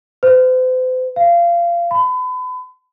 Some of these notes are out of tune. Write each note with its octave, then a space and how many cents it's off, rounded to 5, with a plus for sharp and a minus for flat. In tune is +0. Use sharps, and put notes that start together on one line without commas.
C5 -40
F5 -25
B5 +35